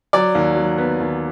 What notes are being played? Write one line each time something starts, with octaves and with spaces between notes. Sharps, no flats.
F#3 D5
D#2
F#3
B3
D#2